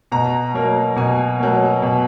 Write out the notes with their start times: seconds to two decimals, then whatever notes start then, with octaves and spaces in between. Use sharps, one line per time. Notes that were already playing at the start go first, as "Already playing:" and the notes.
0.12 B2 A#5
0.54 F#3 A#3
0.96 B2 G#5
1.39 F#3 A#3
1.82 B2